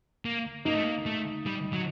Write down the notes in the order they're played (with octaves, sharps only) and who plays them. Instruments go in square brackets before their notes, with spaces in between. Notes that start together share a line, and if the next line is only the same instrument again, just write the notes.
[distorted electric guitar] A#3
[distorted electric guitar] A#3 [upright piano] D#4
[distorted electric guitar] A3
A#3
A3
G3
F#3